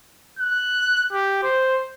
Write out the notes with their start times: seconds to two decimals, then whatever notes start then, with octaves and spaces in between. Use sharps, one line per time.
0.39 F#6
1.13 G4
1.43 C5